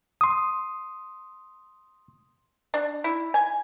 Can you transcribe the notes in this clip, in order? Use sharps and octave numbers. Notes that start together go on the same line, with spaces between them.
C6 D#6
D4
E4
G#5